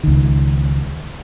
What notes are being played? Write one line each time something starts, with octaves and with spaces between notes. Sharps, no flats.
C#2 D#3